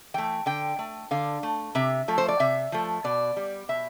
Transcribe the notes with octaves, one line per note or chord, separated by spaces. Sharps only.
E3 A3 G5
D3 G5
A3
D3 F5
A3
C3 E5
F3 A3
C5
D5
C3 E5
F3 A3
B2 D5
G3
B2 E5